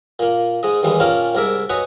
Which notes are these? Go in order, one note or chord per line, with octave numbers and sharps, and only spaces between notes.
A#2 A#3
G#2 G#3 D#5
D#2 E3 G3 G#3
A#2 A#3 C4 C#4 A#4 A5
C2 G#2 A#4 D5 E5
F#4 B4 C#5 D#5 G#5